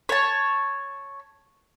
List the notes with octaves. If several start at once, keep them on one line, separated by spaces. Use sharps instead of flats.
C#5 A5